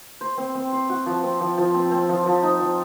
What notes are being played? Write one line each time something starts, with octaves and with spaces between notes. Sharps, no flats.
C5
C4
C4
C5
F#4
F3
C4
F3
F3
C4
C4
F3
F3
D#4
F3